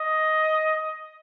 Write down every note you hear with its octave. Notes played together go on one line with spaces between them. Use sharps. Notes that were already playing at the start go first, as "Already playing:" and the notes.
Already playing: D#5